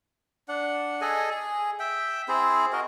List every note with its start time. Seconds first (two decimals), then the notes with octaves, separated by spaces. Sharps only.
0.48 D4 F#5
1.01 G#4 A4 D#5 G#5
1.30 G#4
1.80 E5 G5
2.28 C4 E4 G#4 C5
2.73 F#4 A#4 D#5